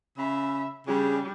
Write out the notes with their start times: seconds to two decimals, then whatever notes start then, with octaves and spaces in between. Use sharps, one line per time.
0.18 C#3 E5 B5
0.87 C#3 G3 D4 G#4